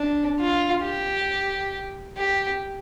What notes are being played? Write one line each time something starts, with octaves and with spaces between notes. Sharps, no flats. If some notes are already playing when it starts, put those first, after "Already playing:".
Already playing: D4
F4
G4
G4